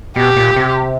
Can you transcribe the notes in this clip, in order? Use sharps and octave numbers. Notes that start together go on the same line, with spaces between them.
B2 G4
A#2
C3